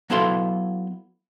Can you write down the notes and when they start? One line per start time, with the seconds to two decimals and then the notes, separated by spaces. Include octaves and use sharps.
0.10 F#3 B3 E4 A4 F5 C6